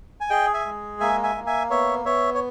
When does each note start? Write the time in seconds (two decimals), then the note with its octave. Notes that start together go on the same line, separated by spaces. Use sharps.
0.21 G#5
0.30 G#4 D#5 G5
0.54 E5 G#5
0.65 G#3
1.00 A#3 E5 G#5
1.23 E5 G#5
1.35 A#3
1.47 E5 G#5
1.70 B3 C#5 E5
2.05 B3 C#5 E5
2.34 C#5